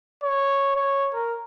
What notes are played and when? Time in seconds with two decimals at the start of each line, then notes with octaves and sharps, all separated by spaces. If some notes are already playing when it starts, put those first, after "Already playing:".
0.23 C#5
0.76 C#5
1.14 A#4